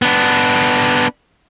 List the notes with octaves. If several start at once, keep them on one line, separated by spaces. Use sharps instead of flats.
B3 D4